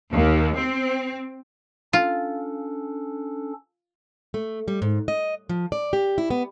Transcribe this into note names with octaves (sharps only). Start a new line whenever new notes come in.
D#2
C4
C#4 D4 F4 A4
A3
G3
G#2
D#5
F3
D5
G4
E4
B3